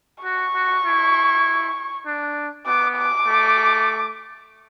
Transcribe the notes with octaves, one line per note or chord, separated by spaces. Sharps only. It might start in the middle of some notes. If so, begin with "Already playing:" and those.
F#4 C#6
F#4
E4
D4
B3 D6
D6
A3